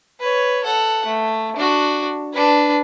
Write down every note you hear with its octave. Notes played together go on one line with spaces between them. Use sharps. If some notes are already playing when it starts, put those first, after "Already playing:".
B4 C#5
A4 F#5
A3
D4 F#4
D4 B4